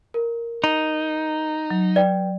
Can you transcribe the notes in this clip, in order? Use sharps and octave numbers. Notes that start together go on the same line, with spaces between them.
A#4
D#4
F#3
B4 D5 G5